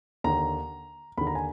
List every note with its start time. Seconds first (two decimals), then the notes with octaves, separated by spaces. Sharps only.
0.24 D#2 D3 A#5
1.17 D#2 B5
1.21 D3
1.27 A#5
1.35 G#5